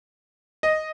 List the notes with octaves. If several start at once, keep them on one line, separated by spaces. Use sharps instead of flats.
D#5